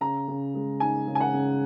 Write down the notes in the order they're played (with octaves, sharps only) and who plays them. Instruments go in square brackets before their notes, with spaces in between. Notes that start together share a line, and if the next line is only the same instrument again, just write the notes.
[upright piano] C#3 A#5
C#3
G#3
D#4 G#5
C#3
G#5
F#5
C#3